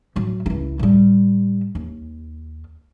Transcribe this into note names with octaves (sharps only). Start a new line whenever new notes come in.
A2 F#3
C#2 E4
A2 G3
D#2